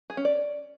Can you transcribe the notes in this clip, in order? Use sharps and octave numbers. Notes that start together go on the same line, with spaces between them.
G#4
C#4
D5